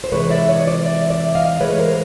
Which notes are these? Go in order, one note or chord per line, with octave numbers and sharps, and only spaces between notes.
C5
C3 E3 G#3 B4 C#5
D5 E5
C#5 D#5
C5 D5
D5 E5
D5 E5
D#5 F5
A2 E3 G#3 B4 C#5
A#4 C5